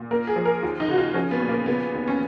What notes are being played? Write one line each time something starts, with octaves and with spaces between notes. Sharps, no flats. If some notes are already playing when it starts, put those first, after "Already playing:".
Already playing: A#2
A#3 A#4
G#4
F3
A#4
D#2 F4
D#4
C#3 F#4
F4
F3 C#4
B3
A#2
A#3
C#3 B3
D#2
C#4